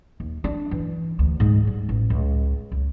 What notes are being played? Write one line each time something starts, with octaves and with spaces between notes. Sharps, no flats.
D#2
D4
E3
D2
G#2
G3
A1
C#2
C#2